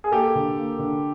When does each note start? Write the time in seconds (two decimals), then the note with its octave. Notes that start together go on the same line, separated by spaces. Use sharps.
0.04 G#4
0.12 A#3 G4 A4
0.35 D3
0.57 A#3
0.79 D3